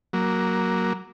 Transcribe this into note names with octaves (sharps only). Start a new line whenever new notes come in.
F#3 A#3